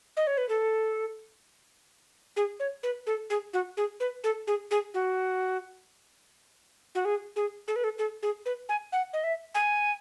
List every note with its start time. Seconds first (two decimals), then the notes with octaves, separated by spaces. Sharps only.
0.17 D#5
0.27 C#5
0.38 B4
0.49 A4
2.36 G#4
2.60 C#5
2.83 B4
3.07 A4
3.30 G#4
3.53 F#4
3.77 G#4
4.00 B4
4.24 A4
4.47 G#4
4.71 G#4
4.94 F#4
6.95 F#4
7.05 G#4
7.36 G#4
7.68 A4
7.76 B4
7.84 A4
7.98 A4
8.23 G#4
8.46 B4
8.69 G#5
8.92 F#5
9.13 D#5
9.24 E5
9.55 G#5